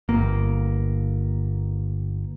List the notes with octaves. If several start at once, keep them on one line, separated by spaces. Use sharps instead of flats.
G1 A#3